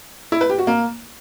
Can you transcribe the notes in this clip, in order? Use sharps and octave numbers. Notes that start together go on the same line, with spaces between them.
E4
B4
G4
F#4
A#3